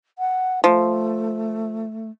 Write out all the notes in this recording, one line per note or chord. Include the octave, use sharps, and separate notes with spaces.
F#5
F3 A3